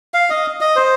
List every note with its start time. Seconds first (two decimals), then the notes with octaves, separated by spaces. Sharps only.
0.14 F5
0.30 D#5
0.61 D#5
0.76 C5